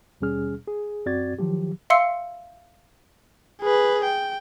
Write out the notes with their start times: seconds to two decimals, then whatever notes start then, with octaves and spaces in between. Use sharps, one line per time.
0.21 D#2 B2 G3 C#4 G#4 F6
0.68 G#4
1.06 F#2 C4 F#4 D5 G#6 A6
1.38 D#3 F3 F#3 G4
1.90 E5 F5 C6 E6 C#7
3.62 G#4 B4
4.04 G5